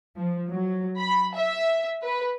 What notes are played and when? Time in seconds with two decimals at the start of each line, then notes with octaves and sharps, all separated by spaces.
0.17 F3
0.50 F#3
0.98 B5
1.35 E5
2.03 B4